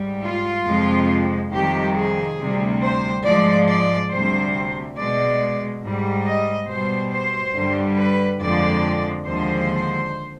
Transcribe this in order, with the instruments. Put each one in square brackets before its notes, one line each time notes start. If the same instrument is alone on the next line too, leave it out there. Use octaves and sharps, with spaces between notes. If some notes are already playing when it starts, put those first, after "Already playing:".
Already playing: [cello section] G#2 G3
F4
F2 C3 F3 G#3
F2 C3 D#3 G3 G4
G#4
D2 C3 G3
C5
G#2 F3 G#3 D5
D5
D2 C3 G3 C5
B2 G#3 D5
G#2 G3
D#5
B2 G3 C5
C5
G2 D3 G3
B4
F2 D3 F3 G#3 D5
D#2 D3 F3 G#3 C5